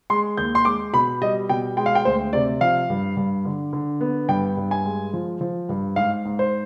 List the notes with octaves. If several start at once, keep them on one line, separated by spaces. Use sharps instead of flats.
G#3 C6
D#2 G6
C6
G#3 D6
B2 B5
G3 D#5
B2 G5
G#3 G5
F5
G5
D2 C5
C3 D5
F3 F5
G2
G2
D3
D3
B3
G2 G5
G2
G#5
G#3
F3
F3
G2
G#2 F5
G#2
C5